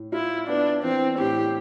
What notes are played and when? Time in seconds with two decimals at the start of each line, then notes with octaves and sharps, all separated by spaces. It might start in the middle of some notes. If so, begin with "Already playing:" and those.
Already playing: A2
0.12 E4 F4
0.48 B3 D4
0.83 E3 C4
1.18 A2 G4